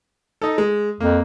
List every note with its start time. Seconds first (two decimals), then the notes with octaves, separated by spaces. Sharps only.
0.42 D#4 A4
0.58 G#3
1.00 F2 A#3